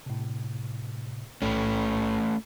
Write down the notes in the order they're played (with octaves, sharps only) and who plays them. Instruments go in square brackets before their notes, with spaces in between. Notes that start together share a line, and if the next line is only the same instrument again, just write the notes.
[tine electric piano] A2 C3
[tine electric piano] B1 A2 B5 [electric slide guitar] A3 C#4